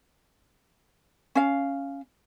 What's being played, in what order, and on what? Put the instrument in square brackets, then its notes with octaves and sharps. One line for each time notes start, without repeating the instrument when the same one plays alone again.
[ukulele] C#4 F5